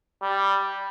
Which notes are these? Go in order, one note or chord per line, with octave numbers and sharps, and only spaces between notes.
G3